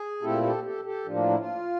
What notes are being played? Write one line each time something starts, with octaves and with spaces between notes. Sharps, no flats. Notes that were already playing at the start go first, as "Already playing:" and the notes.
Already playing: G#4
A#2 F3 A3 C4 E4 G4 A4
G4 A4
G4 A4
G4 A4
A2 F3 A#3 D4 F4
F4
E4
F4